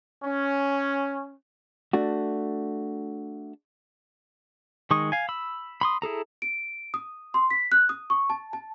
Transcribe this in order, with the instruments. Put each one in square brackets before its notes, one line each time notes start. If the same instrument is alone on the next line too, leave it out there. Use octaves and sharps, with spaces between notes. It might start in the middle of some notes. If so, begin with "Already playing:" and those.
[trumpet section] C#4
[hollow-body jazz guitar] A3 D4 F#4
[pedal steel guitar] D#3 G#3 C#6 D#6
F5 G#5
B5 E6
B5 C6 D#6
E4 G#4 A4 A#5
[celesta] D7
D#6
C6
B6
F#6
D#6
C#6
A5
A5